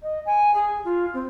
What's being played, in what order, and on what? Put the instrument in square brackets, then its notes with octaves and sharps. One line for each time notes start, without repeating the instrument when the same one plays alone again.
[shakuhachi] D#5
G#5
G#4
F4
C4